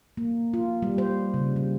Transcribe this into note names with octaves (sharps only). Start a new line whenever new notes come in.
A#3
F4
G3
C5
C#3
G3